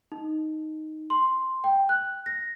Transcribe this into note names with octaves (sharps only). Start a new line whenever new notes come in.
D#4
C6
G5
F#6
A#6